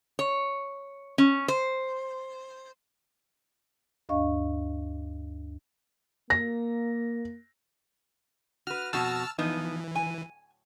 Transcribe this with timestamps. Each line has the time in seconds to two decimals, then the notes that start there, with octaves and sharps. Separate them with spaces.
0.19 C#5
1.18 C#4
1.48 C5
4.09 D2 G2 D4 D#5 F5 C#6
6.30 A#3 A#6
8.67 F#4 B4 F6
8.93 F2 B2 F#4 A5 E6 F6
9.38 E3 F3 B3 D#4
9.95 G#5